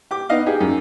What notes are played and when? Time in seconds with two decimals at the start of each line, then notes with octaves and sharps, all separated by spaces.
0.11 G4 D6
0.29 B3 D#4 D#5 F5
0.46 D#4 G4 G#4
0.60 F#2